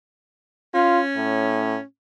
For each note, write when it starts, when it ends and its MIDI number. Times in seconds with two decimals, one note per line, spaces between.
0.74 1.83 61
0.74 1.00 65
1.17 1.77 45